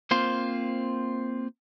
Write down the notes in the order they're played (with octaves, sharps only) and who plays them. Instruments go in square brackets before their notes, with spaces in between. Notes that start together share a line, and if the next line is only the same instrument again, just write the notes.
[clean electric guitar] A#3 C4 F4 C5